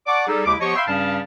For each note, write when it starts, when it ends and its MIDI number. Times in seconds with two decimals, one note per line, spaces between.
0.07 0.27 74
0.07 0.27 78
0.07 0.27 81
0.07 0.27 85
0.07 0.27 86
0.27 0.44 55
0.27 0.44 63
0.27 0.44 68
0.27 0.44 69
0.45 0.55 39
0.45 0.55 49
0.45 0.55 56
0.45 0.55 64
0.45 0.55 86
0.60 0.75 53
0.60 0.75 59
0.60 0.75 67
0.60 0.75 73
0.60 0.75 75
0.60 0.75 85
0.76 0.83 76
0.76 0.83 77
0.76 0.83 79
0.76 0.83 83
0.76 0.83 84
0.87 1.19 43
0.87 1.19 49
0.87 1.19 55
0.87 1.19 61
0.87 1.19 77
0.87 1.19 81